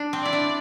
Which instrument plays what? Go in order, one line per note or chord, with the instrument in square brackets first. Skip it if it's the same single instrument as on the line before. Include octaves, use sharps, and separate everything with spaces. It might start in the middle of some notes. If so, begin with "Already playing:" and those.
Already playing: [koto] D4
C4
[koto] E4 [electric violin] D5
[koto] D4